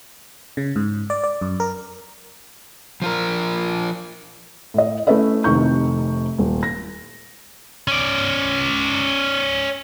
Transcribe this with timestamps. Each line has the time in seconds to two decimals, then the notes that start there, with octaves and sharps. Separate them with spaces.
0.57 C#3
0.76 G#2
1.10 D5
1.24 D5
1.41 F#2
1.60 A#4
3.02 F3 F4 A#4
4.74 A2 D#5
5.07 A3 C#4 E4 B4 D#5 E5
5.44 F1 C3 D#3 C#6 G6
6.38 D#1
6.63 A#6
7.88 C#4 D5